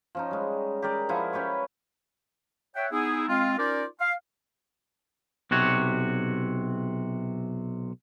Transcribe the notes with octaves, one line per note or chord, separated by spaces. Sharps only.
F3 C#4 D#4
G3 G#3
G4 G#4 A#4 D5
F3 E4 F#5 G#5
C#4 G4 B4 C#5
C#5 E5 F#5 G5
B3 D#4 E4 G#4
G#3 C4 F4
C#4 D#4 F4 A#4 C5 D5
F5
B1 C3 F#4 C#5